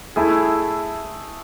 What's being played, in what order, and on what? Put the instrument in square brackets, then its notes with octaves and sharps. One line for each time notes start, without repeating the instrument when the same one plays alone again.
[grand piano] A3 E4 G#4